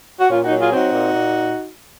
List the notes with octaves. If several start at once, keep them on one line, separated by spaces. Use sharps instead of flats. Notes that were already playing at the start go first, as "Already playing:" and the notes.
F#4
A#2 C#4 F4
D#4 F#4
F#3
F4 G#4
C4 D#4 F#4
A#2
A#2